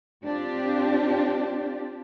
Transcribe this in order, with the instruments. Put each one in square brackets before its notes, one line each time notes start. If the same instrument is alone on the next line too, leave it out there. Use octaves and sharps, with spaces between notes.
[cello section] C4 D4 F4 G4